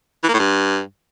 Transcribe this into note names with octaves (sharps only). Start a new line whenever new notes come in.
E3
A#3
A2
G2